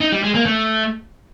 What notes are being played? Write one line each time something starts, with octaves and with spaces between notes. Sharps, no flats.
D#4
G3
G#3
A#3
A3